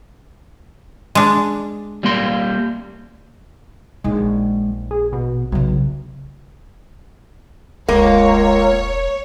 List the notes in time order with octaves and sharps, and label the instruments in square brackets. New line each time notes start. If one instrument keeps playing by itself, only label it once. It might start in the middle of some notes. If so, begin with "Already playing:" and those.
[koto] G#3 D4
[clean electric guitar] G3 A#3 C6
[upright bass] A#1 D#4 [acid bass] G#3
[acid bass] G#4
B2
[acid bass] B1 [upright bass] C#3 F#3
[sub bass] E1 [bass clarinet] C#2 [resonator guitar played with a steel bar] A#3 [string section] C#5